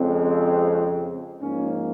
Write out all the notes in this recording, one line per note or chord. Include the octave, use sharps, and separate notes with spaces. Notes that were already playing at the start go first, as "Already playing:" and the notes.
Already playing: F2 C#3 G#3 C4
G#2 F3 A#3 C#4